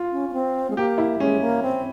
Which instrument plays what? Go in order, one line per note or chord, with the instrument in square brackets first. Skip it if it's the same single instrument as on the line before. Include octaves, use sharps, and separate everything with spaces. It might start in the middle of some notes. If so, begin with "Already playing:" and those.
Already playing: [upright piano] F4
[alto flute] C#4
C#4
C4
G#3
[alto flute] A#3 [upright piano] G4
[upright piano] E4
[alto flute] G#3 [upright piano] C#4
[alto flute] A#3
C4